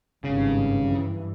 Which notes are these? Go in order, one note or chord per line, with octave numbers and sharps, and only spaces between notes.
G#1 G2 C#3
G2 E3